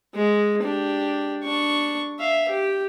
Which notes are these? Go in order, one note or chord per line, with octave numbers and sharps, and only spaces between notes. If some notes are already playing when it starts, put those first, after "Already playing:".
G#3
D4 G4
D4 C#6
E5 F5
G4